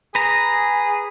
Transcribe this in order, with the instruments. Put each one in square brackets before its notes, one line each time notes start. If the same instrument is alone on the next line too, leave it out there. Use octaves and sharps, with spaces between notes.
[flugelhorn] G#4 [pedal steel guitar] B4 A#5